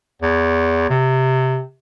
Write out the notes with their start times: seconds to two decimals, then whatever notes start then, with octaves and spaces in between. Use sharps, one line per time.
0.22 E2
0.90 C3